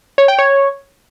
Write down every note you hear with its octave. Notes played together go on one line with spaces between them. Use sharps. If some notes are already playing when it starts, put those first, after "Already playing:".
C#5
G5
C#5